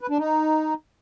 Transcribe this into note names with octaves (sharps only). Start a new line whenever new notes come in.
B4
D4
D#4